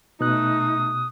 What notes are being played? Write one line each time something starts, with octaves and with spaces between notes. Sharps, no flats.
B2 A3 D#4 D#6 F#6